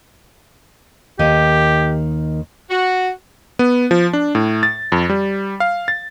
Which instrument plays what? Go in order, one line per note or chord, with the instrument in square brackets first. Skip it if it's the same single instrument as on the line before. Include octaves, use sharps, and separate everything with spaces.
[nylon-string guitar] D#2 D#3 D#5 [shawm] G4
[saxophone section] F#4
[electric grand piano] B3
F3
D4
A2
A6
F2
G3
F5
A6